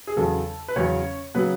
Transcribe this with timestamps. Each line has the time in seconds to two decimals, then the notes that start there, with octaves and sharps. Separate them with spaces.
0.07 G#4
0.16 E2 C#3 F#3 A4
0.68 B4
0.76 E2 C#3 F#3 C#4 C#5
1.34 C#3 F#3 B3 B4